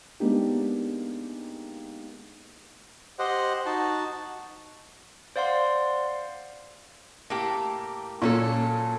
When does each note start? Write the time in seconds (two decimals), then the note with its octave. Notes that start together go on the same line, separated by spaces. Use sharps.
0.20 G#3 A#3 B3 D4 D#4 G4
3.19 G4 C5 D#5 F#5
3.66 D#4 F#4 A5
5.36 C5 D5 F5 F#5 C6
7.30 A2 A#3 G4
8.22 A#2 F#3 C#4 A4